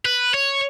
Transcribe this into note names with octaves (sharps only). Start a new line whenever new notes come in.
B4
C#5